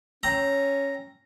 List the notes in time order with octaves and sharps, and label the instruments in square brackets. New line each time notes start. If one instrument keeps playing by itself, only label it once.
[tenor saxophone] C#4 [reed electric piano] C#5 G5 E6 [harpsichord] A#5